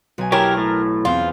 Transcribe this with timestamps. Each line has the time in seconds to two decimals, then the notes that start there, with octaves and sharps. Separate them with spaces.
0.18 B1 G#5
0.32 E4 G4 A#4 C#5 A5
0.57 A2
1.05 E2 C4 F4